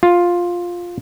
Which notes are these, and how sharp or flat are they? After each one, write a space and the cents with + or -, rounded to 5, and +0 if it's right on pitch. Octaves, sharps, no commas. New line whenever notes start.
F4 +5